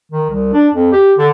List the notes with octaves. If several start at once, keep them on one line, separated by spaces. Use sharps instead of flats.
D#3
C2
D4
F2
G4
D3